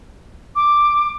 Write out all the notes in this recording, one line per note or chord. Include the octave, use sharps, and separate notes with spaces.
D6